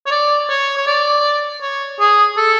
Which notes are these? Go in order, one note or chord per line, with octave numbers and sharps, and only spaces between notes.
C#5
D5
C#5
C#5
D5
C#5
G#4
A4